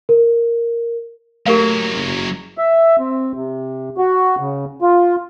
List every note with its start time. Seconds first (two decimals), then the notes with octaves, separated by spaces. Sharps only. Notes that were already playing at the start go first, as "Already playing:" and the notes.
0.09 A#4
1.46 F#3 A3 A#3 G4 A#4 F5
1.94 F#1
2.58 E5
2.99 C4
3.35 C3
3.98 F#4
4.40 C#3
4.82 F4